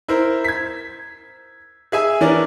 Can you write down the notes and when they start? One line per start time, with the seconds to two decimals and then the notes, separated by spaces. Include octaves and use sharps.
0.08 E4 A#4 C5
0.44 G#6 B6
1.92 G#4 E5 G#5
2.21 E3 C#4 D4 A#4 D5